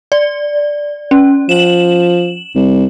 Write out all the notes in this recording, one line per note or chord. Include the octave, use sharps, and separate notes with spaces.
D5
C#4
F3 E7 F#7
C2